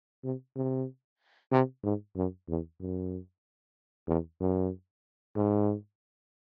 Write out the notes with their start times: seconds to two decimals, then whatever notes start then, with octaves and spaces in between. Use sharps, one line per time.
0.24 C3
0.56 C3
1.52 C3
1.84 G#2
2.16 F#2
2.49 E2
2.80 F#2
4.08 E2
4.40 F#2
5.36 G#2